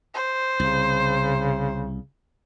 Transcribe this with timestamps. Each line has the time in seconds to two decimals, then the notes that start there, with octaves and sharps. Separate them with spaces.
0.14 C5
0.60 C2 C#3